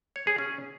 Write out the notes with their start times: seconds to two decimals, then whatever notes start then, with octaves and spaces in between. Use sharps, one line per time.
0.16 C#5
0.27 G#4
0.38 C#4